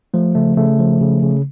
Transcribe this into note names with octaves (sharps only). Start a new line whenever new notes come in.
F3 A3
C#3 A3
C#3 A3
F3
C#3
C#3